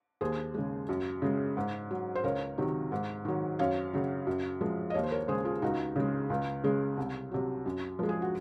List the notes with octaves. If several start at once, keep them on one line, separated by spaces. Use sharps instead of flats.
D#2 G#4 C5
C#3 G#3
F#2
C#3 G#3
G#2
F#3
C5
C#2 A#4 C#5
C3 D#3 F#3
G#2
D#3 F#3
F#2 C#5 F5
C#3 F#3
F#2
F3 G#3
D#5
D#2 C#5 F5
C5
A#4 C#5
C#3 G#3 G#4 C5
F4 G#4
C#2 D#4 F#4
C#3 G#3
C#2
C#3 G#3
C2
C3 F#3
F#2
F3 G#3
G#4
F#4